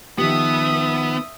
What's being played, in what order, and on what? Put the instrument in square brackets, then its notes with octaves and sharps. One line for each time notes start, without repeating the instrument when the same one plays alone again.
[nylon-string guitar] D#3 F3 G4 [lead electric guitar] B3 [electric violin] E5 D#6